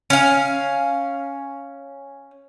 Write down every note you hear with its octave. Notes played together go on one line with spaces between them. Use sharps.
C#4 F5